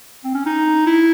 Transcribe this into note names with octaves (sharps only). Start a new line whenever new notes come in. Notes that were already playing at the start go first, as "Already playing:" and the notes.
C4
C#4
D#4
E4